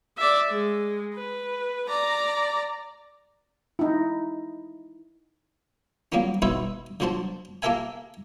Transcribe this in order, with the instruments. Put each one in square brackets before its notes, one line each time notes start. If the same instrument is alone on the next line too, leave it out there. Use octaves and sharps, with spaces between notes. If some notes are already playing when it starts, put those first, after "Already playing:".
[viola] D5 E5
G#3
B4
D5 A#5
[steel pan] D#4 E4
[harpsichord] F#3 G3 A#3 B3 C#4
B2 D#4 B4 C#5 E5 C6
D3 F#3 F#4 C5 A5
A#3 G4 A4 A#4 E5 G#5